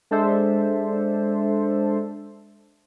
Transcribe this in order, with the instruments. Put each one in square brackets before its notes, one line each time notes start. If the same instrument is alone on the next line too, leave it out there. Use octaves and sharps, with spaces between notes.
[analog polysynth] G#3 D4 A4 C5 E5